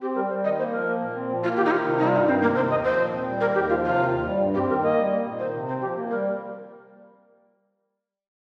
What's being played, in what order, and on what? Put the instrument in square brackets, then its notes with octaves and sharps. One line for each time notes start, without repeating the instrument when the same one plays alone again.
[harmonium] C4 [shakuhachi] G4
[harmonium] G3 [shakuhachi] A#4
[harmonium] G3 [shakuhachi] C5
[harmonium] D#3 [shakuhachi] D#5
[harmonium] A#3 [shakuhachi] C5
[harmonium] F3 [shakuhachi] A#4
[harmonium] A#3
A#2
C4
F3
[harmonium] A#3 [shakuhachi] F4
[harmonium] D#3 [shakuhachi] G4
[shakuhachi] D#4
[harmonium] D#3 [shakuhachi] F4
[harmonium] C3
[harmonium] G3 [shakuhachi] D#4
[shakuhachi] F4
[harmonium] G2 [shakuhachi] D#4
[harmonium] D#3 [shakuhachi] C4
[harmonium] C3 [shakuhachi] A#3
[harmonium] D#3 [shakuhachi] C5
[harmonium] D#2 [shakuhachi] D#5
[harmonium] F3 [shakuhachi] C5
[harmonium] A#2
C4
G3
[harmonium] D#3 [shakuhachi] A#4
[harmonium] D#2 [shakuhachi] G4
[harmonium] F3 [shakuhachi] F4
[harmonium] C3 [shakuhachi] F4
[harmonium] D#3
D#2
G3
G2
[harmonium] C4 [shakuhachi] G4
[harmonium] D#3 [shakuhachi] A#4
[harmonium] A#3 [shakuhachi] D#5
[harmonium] G3
A#3
A#2
[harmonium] D#3 [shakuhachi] C5
[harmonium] C3
[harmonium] C4 [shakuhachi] C5
[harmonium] F3 [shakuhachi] G4
[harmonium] A#3
[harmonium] G3 [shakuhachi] A#4